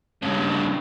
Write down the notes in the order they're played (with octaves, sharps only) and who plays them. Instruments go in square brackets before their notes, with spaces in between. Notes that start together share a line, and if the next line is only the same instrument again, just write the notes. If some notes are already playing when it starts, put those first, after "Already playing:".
[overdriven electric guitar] G2 C#3